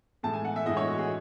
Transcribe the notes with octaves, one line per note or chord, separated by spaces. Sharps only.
A2 E3 G#3 A5
G#5
F#5
E5
A2 E3 G#3 D#5
C#5
F#4
G#4